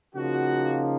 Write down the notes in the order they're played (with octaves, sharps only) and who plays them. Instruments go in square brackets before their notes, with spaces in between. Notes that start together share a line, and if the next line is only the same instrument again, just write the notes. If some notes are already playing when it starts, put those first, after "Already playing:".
[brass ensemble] C#3 F3 A#3 D#4 F#4